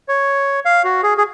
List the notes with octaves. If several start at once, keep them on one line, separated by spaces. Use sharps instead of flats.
C#5
F5
F#4
G#4
G#4